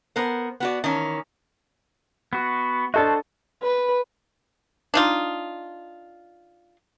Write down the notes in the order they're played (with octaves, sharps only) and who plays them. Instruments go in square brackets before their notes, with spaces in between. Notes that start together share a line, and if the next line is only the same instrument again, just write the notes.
[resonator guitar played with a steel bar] B3 A#4 C5
B3 F#4 D5
D#3 E3 C#4
[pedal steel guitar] B3 F#4
[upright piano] D4 A4 D#5 [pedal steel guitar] F#4 C5 A5
[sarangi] B4
[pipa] D4 D#4 F4